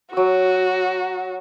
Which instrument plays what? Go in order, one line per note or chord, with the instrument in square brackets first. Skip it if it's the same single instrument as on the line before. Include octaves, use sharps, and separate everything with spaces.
[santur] F#3 E6 [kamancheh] F#4